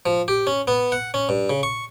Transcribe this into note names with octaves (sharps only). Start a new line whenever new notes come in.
F3
G4
C#4
B3
F#5
C#4
G2
C#3
C#6